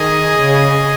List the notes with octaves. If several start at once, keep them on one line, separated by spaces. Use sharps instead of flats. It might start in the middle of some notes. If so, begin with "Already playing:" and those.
Already playing: D#3 G#4 D#5 G#5
C#3